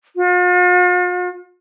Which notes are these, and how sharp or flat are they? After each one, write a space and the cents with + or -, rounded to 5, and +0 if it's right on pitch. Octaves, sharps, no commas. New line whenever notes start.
F4 +45